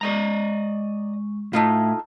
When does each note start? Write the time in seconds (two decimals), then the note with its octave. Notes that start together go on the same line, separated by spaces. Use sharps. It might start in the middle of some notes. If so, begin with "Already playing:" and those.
0.01 G#3 D5 D#5 A#5 C#6
1.53 A2 A3 D#4 F4